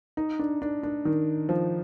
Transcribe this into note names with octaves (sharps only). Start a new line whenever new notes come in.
D#4
D4
D4
D4
D#3
F3